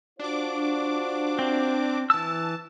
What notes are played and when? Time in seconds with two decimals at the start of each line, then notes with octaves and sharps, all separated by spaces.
0.19 D4 F4 F#4 C5 D6
1.39 C4
2.10 E3 A5 E6